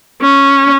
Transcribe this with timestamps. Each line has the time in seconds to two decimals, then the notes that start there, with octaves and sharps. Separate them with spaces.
0.22 C#4